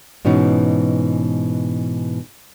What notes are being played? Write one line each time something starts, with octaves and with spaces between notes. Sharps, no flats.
G#2 B2 E3 C#4 D#4